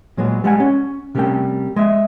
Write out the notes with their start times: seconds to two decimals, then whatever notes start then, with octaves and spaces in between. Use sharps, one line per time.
0.17 A#2 F#3 G#3 B3
0.44 G3 G#3 F#5 G#5
0.60 C#4
1.15 C3 G3 A3 C#4 A#4 G5
1.76 G#3 D#5 E5